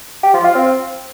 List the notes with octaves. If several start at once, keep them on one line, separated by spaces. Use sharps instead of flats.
G4
F3
F4
C4